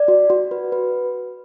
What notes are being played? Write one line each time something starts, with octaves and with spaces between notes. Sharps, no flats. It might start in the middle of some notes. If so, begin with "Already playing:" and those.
Already playing: D5
F#4
F#4
B4
B4